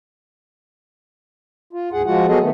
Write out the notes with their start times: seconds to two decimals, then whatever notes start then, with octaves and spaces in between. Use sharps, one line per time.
1.73 F4
1.93 D2 G#2 G#4 F#5
2.06 F3 G#3 F4 F#4 F#5
2.28 F#3 B3 F#4 G#4 A4 D#5
2.40 D#3 A3 B3